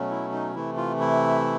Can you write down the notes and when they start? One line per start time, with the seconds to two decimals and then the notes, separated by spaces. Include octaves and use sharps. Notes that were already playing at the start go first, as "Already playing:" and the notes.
Already playing: B2 F#3 A3 C#4
0.10 E4
0.32 D#4
0.55 C3 E3 A3 E4
0.77 F4
1.00 E4